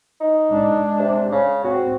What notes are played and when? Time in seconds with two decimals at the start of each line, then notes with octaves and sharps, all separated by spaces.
0.21 D#4
0.51 G#3 D4
0.99 C3
1.32 C#3
1.64 C4 F#4